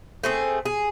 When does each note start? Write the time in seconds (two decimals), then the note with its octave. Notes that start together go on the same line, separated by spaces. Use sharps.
0.24 A3 C4 G#4
0.65 G#4